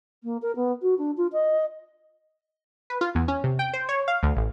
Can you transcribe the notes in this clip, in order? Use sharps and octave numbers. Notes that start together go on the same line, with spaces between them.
A#3
A#4
B3
F#4
D4
F4
D#5
B4
F4
E2
C#4
C3
G5
C5
C#5
F5
D2
A1